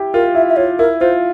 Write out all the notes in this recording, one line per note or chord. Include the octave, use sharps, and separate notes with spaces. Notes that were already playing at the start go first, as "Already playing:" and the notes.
Already playing: E4 G4
F4 A#4
E4 E5
E5
F4 C#5
E4 A#4
F4 C5